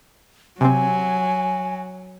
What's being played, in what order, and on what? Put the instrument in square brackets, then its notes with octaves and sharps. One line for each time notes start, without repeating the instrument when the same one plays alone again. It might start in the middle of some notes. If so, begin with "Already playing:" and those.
[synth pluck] C3 C4 [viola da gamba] F#3 [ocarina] G#5